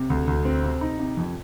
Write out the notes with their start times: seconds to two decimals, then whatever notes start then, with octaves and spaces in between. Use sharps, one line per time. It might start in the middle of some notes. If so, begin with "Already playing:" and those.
Already playing: C3
0.10 D2
0.28 D2
0.45 C4
0.64 C3
0.81 D#4
0.99 C3
1.17 F2